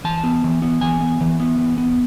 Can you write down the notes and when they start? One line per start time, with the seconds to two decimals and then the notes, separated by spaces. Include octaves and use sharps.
0.04 E3 A5
0.24 B3
0.44 E3
0.62 B3
0.81 E3 G#5
1.01 B3
1.21 E3
1.40 B3
1.58 E3
1.78 B3